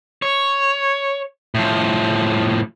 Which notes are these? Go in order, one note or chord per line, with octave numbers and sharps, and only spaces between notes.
C#5
A2 F3